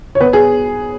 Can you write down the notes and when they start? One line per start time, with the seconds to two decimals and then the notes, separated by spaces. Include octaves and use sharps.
0.15 C#5
0.21 B3 B4
0.33 G#4